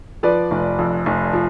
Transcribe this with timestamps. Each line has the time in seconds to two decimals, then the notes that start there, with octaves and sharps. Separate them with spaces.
0.23 F3 B4 D5
0.51 F1
0.79 F2
1.06 F1
1.33 F3